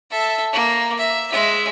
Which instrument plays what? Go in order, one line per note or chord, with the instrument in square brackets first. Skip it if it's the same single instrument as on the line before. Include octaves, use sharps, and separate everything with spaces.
[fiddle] A4 E5
A#3
E5
G#3 E5